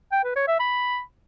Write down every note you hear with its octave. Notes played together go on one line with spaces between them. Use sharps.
G5
B4
C#5
E5
B5